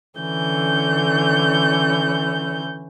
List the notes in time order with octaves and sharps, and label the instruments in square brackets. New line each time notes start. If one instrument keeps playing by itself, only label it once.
[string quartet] D3 E3 C#4 G6